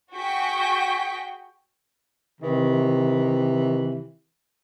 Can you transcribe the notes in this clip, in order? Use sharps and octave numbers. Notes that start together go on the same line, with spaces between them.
F#4 G#4 G5 C#6 B6
C3 D#3 E3